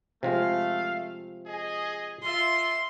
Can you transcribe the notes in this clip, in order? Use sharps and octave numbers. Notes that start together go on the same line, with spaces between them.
C3 F3 G#3 A3 F5
G#4 D#5
F4 E5 C6